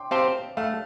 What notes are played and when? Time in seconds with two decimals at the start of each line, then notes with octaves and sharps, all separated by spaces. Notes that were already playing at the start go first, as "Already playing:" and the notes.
Already playing: G5 C6 D6
0.11 C4 G4 C5 F5 A5
0.57 A3 F5